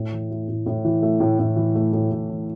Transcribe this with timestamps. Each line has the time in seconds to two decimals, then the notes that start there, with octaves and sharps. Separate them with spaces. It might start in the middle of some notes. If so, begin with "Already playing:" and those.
Already playing: A2
0.12 E3
0.31 A3
0.48 A2
0.66 A2
0.85 E3
1.03 A3
1.20 A2
1.39 A2
1.56 E3
1.75 A3
1.93 A2
2.11 A2
2.30 E3